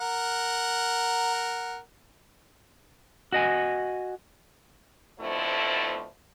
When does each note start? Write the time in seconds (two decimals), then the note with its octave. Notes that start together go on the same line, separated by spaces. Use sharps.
0.01 A#4 F#5
3.32 F#4 D#5 G#5
5.20 B2 D3 F3 A3 C4 E4